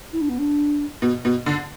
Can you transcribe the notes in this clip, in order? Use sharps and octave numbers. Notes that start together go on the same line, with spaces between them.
E4
D4
B3
D4
B2
B2
D3